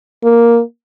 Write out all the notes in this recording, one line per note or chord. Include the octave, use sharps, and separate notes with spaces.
A#3